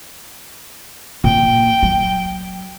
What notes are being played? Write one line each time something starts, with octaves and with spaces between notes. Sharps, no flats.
A#2 G5
F#3